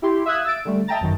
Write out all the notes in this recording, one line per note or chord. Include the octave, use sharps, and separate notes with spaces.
E4 G4 C6
E5 F5 D#6 E6 F#6 G#6
E6 A6 D7
D3 G3 A3
D#5 E5 G5 A5 A#5 A6
G1 F#2 D#3